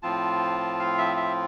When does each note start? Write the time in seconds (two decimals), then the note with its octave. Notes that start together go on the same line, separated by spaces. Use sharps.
0.03 A2 F3 C4 F4 A5
0.79 F5
0.98 E5
1.17 E5